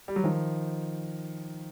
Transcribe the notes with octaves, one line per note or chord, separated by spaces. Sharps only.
G3
F#3
D#3 F3